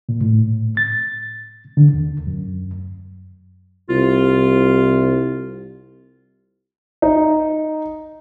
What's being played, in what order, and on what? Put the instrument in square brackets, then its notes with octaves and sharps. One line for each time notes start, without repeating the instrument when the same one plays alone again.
[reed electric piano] A#2
A2
A6
D3
D#2
F#2
[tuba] C2 [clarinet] F4
[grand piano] D#4